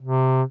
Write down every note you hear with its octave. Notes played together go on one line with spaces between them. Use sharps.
C3